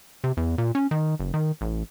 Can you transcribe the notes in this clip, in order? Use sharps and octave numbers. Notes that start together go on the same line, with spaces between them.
C3
E2
A#2
C#4
D#3
F#1
D#3
A1